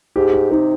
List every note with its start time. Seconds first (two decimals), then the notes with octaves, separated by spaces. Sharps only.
0.16 G#2 G4
0.33 G4
0.51 C3 D#4